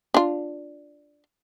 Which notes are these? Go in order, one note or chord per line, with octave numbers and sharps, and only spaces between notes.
D4 F4